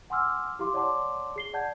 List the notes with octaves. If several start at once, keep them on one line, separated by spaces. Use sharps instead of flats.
F#5 G#5 C6 D6 E6 F6
E4 G4 F5 C6 D6
C#5 D5 F#5 A5 C6 D6
G#4 C7 G7
D5 F#5 A5 G6 G#6